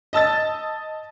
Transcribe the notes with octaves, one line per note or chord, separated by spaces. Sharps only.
D#5 A5 E6 A6